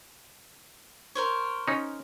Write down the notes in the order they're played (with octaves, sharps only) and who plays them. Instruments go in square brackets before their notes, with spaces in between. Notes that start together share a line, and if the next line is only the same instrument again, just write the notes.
[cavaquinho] A#4 C5 C#5
[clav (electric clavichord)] C#4 D#4